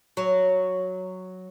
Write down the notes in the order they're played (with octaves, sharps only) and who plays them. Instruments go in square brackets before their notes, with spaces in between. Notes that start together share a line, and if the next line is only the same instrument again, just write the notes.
[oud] F#3